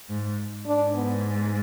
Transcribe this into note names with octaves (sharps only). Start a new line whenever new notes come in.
G#2
G#2 D4
B3